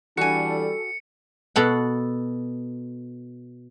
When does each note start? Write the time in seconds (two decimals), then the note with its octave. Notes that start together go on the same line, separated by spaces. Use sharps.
0.17 E3 G3 D4 F#4 A4 G#5 C#7
1.56 B2 A4 F#5